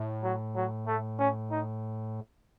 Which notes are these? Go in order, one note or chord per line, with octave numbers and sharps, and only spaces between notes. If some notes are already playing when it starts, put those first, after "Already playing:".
Already playing: A2
F#3
F#3
A3
C#4
D#4